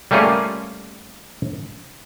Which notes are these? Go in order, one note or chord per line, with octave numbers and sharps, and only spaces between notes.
G3 A3 A#3 C#4 F4 G#4